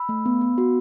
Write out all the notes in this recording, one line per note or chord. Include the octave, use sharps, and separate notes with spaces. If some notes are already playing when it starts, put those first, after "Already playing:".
Already playing: B5 E6
A3
B3
B3
F#4